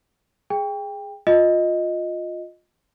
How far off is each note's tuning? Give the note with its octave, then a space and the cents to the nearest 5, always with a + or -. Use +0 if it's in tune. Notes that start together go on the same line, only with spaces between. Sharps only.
G#4 +0 G5 +25
F4 +20 D#5 +0